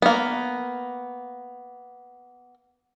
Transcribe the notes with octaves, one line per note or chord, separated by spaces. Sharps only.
A#3 B3